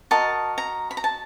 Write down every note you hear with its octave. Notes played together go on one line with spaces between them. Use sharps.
F#4 A#4 D#5 A5
A#5
B5
A#5
A5